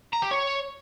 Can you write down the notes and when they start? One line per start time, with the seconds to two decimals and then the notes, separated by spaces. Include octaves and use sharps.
0.13 A#5
0.22 G4
0.31 C#5